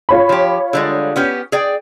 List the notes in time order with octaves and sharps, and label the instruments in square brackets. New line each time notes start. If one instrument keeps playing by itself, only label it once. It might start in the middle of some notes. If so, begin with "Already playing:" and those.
[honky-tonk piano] F4 C#5 B5
[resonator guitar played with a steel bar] F3 G4
D3 G3 G#3
B3 C#4 G4
G#4 D5 G5